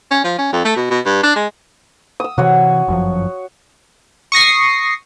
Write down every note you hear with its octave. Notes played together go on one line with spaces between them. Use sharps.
C#4
F3
C#4
F2
A3
B2
B2
G2
D4
G#3
D#6 E6
C3 E3 F#4 C#5
G1 F#2 F3
C#6 D#6 A#6 C7